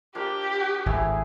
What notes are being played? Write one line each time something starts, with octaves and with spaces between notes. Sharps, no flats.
F3 A#3 D4 G4
G#1 A3 E4 G#4